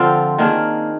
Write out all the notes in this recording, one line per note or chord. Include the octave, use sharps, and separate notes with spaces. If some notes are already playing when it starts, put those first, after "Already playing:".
Already playing: D3 F3 C4 F4
D#3 A#3 D4 G#4